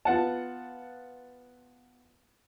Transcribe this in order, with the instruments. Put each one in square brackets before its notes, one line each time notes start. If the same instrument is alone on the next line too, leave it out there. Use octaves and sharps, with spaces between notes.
[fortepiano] B3 F4 F#5 A5